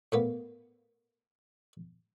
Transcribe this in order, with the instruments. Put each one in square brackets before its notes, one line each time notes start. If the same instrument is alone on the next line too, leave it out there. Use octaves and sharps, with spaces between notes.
[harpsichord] A2 A#3 B3